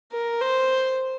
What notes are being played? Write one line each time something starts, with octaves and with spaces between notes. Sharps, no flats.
A#4
C5